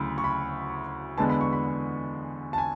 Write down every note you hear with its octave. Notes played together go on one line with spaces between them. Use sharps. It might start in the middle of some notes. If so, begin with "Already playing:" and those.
Already playing: D2 C#3 F#3 A3 E4 B5
C#6
B5
E2 D3 G#3 B3 A5
B5
C#6
B5
A5
G#5